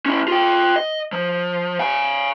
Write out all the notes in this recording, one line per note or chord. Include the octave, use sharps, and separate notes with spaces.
C#4 E4
F4 G5
D#5
F3
F5 G#5